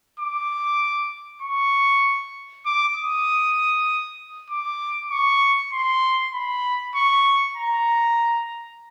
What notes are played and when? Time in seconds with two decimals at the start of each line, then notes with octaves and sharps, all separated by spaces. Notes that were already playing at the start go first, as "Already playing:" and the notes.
0.20 D6
1.42 C#6
2.66 D6
2.96 D#6
4.50 D6
5.11 C#6
5.73 C6
6.33 B5
6.95 C#6
7.57 A#5